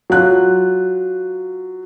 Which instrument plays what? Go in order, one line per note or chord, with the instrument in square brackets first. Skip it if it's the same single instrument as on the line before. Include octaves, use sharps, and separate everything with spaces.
[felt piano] F#3 F4 F#6